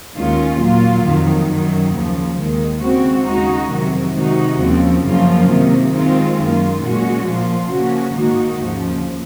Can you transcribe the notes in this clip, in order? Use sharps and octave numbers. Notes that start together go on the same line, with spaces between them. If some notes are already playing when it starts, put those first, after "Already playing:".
D#2 D#3 G#3 C#4 F4
A#2 F#3 A#3 F4
F2 D#3 F#3
F#2 D#3 F#3
D#2 C#3 F3
D#2 D#3 G#3
C#3 G#3 C4 F#4
D#2 C#3 G#3 D#4 F#4
F2 C3 D#3 F#3
C3 D#3 G#3 D#4 F#4
D#2 C#3 F3 C4
F#2 C#3 F3 A#3 F4
C3 D#3 A#3
D#3 G#3 C4 F4
F#2 D#3 A#3 F4
A#2 G#3 C#4 F#4
A#2 F3 A#3 F4
C#3 F3 A#3 C#4 F#4
G#2 D#3 A#3 D#4 F#4
D#2 C#3 F3